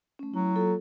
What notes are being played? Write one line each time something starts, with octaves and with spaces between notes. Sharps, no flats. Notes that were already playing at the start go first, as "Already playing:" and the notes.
A3 C#4
F#3 E4
A#3 F4 A4